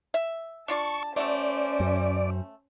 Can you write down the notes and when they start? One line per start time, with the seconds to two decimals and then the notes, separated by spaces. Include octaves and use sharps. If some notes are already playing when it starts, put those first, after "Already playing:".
0.14 E5
0.68 D4 F4 D5 A5 C#6
1.16 A3 C#4 F#4 A4 C5 D5
1.80 F#2